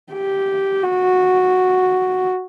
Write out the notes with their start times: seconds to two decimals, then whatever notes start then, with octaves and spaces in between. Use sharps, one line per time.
0.13 G4
0.83 F#4